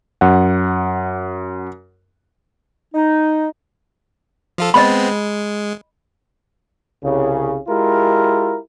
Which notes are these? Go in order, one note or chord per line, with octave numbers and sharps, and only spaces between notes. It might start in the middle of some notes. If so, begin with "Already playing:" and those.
F#2 F#5
D#4
F3 F4 A4
G#3 B3 C4 D#5 B5
G#3
C2 C#3
G#3 E4 F4 G4 A#4